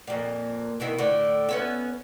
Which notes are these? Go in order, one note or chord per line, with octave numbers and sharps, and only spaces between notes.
F2 A#2
B2 D#3 E4
A2 D3
B3 C#4 E5